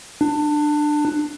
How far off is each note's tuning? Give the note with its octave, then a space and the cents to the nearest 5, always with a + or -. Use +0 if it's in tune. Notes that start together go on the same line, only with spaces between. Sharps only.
D4 +20